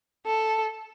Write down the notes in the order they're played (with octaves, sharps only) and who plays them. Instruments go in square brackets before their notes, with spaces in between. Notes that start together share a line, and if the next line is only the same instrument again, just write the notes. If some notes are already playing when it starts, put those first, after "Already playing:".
[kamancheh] A4